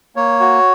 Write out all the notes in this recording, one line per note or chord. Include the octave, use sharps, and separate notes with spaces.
A#3 C#5
F#4